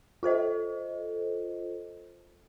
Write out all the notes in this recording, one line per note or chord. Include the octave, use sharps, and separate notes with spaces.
F4 A4 C5 D#5